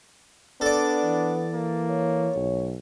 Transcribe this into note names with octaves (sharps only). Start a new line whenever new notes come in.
B3 D4 A4 D5
E3
A#3
C#5
B1